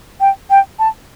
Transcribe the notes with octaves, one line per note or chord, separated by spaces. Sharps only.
G5
G5
A5